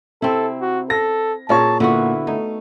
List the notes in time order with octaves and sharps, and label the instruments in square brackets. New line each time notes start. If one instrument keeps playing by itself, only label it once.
[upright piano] C3 [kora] C4 E4 [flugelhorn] A4
[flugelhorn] F#4
[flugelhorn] A4 [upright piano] A#6
[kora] A#2 A#4 [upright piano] G#4 C#5 C#6 [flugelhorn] A5
[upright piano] A#2 [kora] D3 B3 F#4 [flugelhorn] E4
[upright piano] A3 [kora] D#4